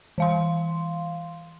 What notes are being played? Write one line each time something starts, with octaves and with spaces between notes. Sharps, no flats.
E3 F5 C6